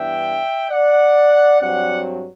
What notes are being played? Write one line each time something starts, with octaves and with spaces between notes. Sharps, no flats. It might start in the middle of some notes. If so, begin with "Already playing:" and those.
Already playing: G2 E3 B3 D4 E5 G5
D5 F#5
G2 F#3 C4 D5 F#5